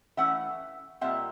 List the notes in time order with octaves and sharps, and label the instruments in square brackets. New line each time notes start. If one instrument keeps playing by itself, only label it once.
[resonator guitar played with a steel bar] E3 A3 C#4 E5 F#5
A#2 G3 C4 E5 F#5